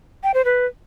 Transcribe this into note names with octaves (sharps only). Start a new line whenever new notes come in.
G5
C5
B4